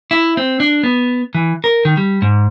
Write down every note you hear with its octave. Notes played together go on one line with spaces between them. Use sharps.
E4
C4
D4
B3
E3
A#4
D#3
G3
G#2